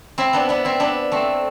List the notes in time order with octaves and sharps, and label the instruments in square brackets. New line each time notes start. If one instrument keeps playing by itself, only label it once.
[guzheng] C4 E4
B3 D4
B3 D4
C4 E4
B3 D4
A3 C4